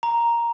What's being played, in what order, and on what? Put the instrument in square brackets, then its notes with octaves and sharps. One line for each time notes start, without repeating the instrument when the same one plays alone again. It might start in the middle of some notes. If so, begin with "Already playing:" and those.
[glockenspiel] A#5